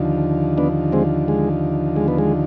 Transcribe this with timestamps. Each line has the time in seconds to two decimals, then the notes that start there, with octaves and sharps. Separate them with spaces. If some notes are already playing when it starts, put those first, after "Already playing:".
Already playing: D#2 D3 F3
0.58 B3 D4
0.92 G#3 C4
1.28 G#3
1.96 G#3
2.08 B3
2.18 G#3